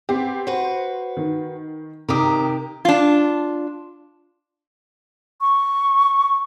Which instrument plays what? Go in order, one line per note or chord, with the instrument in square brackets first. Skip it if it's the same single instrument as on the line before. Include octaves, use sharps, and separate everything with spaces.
[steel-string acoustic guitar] B3 [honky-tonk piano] C4 G4
[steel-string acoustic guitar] F#4 B4 [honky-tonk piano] C5
[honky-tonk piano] D#3
[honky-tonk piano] C3 D6 D#6 [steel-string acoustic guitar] D#3 G4 A#4
[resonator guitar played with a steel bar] D4 F4
[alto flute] C#6